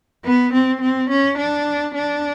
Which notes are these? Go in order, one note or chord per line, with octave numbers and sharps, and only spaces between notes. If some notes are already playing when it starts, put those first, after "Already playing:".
B3
C4
C4
C#4
D4
D4